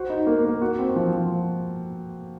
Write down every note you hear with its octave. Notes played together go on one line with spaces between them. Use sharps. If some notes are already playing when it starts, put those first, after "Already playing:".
Already playing: F#4 C5
D#4
A#3
A#3
F#4
C4
F3
F3